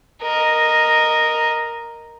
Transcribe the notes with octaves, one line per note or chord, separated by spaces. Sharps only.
A#4 D#5